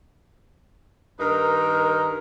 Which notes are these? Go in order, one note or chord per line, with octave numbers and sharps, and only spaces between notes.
G2 D#3 D#4 A#4